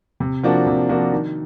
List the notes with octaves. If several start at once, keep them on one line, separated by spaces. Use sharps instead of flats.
C3
F3 A#3 D4 F#4
C3
F3 A#3 D4 F#4
D#3